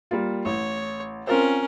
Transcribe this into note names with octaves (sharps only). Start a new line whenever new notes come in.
G3 A#3 F4
A1 C#5
C4 C#4 F4 A#4 C5